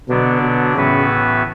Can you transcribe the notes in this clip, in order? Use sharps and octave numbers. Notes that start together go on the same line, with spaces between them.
B2 D3 F#3 B3 D4
B2
A2 C#3 E3 B3 F#4 B4